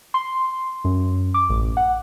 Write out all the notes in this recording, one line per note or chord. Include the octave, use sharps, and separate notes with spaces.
C6
F#2
D6
A1
F#5